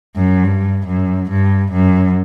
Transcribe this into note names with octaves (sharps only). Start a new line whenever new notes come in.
F#2
G2
F#2
G2
F#2